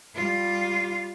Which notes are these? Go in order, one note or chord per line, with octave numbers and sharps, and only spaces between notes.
G3 F4